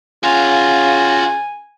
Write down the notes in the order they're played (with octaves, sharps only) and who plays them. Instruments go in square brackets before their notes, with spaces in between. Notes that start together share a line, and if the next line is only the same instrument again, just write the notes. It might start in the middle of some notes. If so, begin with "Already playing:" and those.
[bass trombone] C#3 [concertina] F4 [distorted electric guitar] F#4 F5 [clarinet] G#5